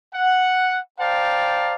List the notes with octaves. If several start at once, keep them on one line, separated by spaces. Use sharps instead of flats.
F#5
C5 D5 F5 G5 A5 A#5